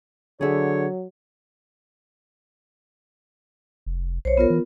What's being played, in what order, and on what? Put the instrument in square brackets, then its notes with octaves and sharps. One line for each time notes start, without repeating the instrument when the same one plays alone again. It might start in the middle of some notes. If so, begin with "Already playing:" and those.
[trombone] D3 [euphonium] F#3 [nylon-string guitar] G#4 E5 [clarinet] C#5
[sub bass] F1
[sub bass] B1 [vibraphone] C5 C#5
[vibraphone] B3 F4 A#4
[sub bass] E3